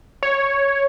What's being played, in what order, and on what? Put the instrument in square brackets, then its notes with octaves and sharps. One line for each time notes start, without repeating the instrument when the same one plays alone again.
[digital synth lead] C#5